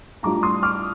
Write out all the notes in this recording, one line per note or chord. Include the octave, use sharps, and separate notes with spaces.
A2 G3 D4 F4 A#5 D6
C6 D#6
D6 F6